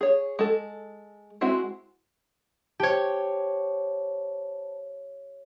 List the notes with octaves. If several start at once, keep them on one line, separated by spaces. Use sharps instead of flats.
G#4 C#5
G#3 A4
G#3 C4 E4 F#4
G4 C5 C#5 A5